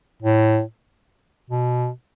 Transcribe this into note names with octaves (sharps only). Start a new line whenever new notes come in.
A2
B2